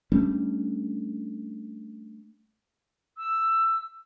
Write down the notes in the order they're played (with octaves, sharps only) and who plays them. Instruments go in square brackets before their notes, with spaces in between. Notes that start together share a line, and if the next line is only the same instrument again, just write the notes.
[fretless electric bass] G3 A3 C#4 D4
[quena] E6